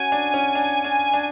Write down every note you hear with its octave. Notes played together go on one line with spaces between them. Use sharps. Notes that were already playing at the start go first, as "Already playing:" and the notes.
Already playing: C#4 F#4 G#5
D4
C#4
D4
D4
D4